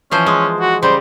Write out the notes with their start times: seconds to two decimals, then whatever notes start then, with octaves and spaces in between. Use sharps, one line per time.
0.11 E3 F3 C#4 C5
0.26 G#3
0.61 F#4
0.83 C#3 G3 C5